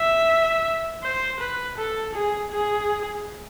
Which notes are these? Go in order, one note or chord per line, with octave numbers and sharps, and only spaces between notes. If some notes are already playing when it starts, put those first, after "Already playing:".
Already playing: E5
C5
B4
A4
G#4
G#4